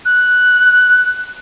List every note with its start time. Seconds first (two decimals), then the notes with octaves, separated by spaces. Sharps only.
0.05 F#6